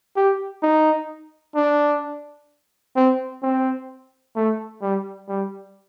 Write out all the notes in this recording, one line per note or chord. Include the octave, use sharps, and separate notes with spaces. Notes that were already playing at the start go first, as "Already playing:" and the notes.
G4
D#4
D4
C4
C4
A3
G3
G3